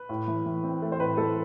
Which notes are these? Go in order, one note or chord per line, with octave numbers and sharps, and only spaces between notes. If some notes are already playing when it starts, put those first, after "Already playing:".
Already playing: B4
A2
E3
E3
C4
A3
C5
A2 B4
E3 A4